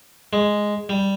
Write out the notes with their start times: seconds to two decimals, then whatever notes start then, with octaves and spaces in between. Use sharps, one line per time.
0.33 G#3
0.89 G3